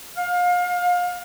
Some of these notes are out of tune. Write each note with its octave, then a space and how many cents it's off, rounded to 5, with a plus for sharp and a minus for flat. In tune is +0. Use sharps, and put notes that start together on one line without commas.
F5 +30